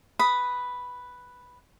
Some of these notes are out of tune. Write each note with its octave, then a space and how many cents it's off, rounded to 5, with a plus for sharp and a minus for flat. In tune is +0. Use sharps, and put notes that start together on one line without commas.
B4 +0 B5 +0 D#6 +0